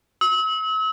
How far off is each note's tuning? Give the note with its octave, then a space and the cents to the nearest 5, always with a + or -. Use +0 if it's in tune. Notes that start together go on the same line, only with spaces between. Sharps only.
E6 -40